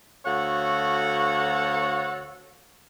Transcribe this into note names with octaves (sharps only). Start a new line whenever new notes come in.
D2 F#4 A4 C#5 F5 F#5